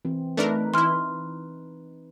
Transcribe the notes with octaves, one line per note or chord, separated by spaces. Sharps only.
E3 C4
A3 D4 D#4 A#4 B4
E3 E4 C6 F6